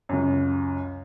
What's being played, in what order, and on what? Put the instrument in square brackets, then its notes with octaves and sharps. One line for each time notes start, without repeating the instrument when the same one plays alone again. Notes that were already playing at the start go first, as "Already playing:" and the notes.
[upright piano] C#2 F#2